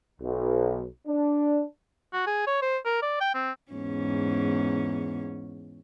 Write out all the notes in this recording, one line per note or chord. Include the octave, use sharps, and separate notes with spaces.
B1
D4
F#4
G#4
C#5
C5
A#4
D5
G5
C4
E2 G#2 C#4